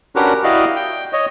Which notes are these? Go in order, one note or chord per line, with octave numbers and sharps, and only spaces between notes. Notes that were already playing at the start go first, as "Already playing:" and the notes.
C#4 D4 F#4 G4 A#4 B4
E4 F#4 G4 D5 D#5 F5
G5
C#5 D#5